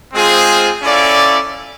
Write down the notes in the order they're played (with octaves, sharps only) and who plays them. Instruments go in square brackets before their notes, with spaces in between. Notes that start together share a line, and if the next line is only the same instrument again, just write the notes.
[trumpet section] G#3 C4 F4 G#4 C5
C#4 E4 A4 D5 F5